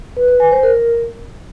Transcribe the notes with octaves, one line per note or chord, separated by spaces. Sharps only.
B4
B4
G#5
C5
A#4